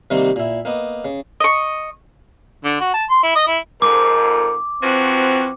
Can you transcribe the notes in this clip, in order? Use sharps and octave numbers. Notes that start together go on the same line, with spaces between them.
C3 D#3 G3 A#3 C4
A#2 E4
A#3 B3 D#5
C#3
D#5 C#6
D3
F#4
A5
C6
E4
D#5
E4
F2 G#2 A#4 D6
E3 F3 C4 F#4